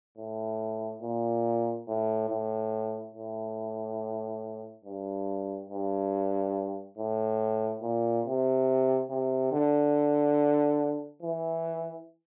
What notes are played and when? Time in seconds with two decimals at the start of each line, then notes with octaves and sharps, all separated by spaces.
0.17 A2
1.02 A#2
1.88 A2
2.30 A2
3.14 A2
4.85 G2
5.70 G2
6.98 A2
7.82 A#2
8.25 C3
9.10 C3
9.52 D3
11.22 E3